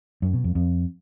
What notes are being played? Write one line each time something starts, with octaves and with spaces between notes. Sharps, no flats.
F#2
B2
F2
F2